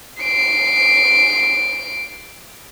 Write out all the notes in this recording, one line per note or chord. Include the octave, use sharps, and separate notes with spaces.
C7 D7